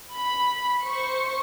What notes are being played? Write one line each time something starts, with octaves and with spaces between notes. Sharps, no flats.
B5
C5 C#6